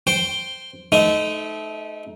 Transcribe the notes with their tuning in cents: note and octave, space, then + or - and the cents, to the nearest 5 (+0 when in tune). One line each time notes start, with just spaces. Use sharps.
C5 +0 G5 +0
A3 -25 D#4 +5 C5 -30